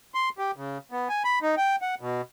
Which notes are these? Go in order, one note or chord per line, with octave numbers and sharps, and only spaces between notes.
C6
G4
C#3
B3
G#5
B5
D#4
G5
F#5
B2